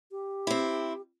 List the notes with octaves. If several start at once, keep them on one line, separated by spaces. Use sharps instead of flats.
G4
C4 E4